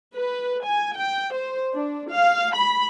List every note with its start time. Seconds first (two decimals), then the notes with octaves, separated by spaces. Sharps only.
0.15 B4
0.65 G#5
0.99 G5
1.34 C5
1.73 D4
2.10 F5
2.55 B5